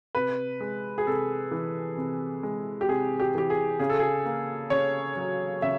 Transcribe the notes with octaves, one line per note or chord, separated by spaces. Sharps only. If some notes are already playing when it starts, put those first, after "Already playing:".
C3 B4
G#3
G#4
C3 A4
E3
C3
G#3
G4
C3 G#4
G4
E3 G4
G#4
C#3 G#4
A4
G#4
A#3
C#3 C#5
F#3
C#3 E5